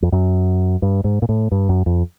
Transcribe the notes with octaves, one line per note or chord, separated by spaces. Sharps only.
F2
F#2
G2
G#2
A#2
A2
G2
F#2
F2